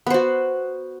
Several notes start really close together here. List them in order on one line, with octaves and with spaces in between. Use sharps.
B3 C5 F#4